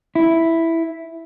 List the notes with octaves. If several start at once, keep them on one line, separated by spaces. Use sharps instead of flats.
E4